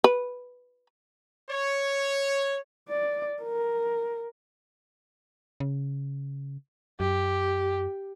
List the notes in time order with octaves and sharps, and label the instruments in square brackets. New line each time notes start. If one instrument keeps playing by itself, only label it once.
[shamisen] B4
[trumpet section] C#5
[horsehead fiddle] D5
A#4
[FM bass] C#3
[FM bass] F#2 [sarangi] G4